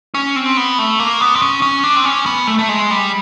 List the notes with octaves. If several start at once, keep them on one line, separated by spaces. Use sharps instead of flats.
C#4
C4
B3
A3
A#3
B3
C4
C#4
C#4
D4
C4
C#4
B3
A3
A3
G#3
G3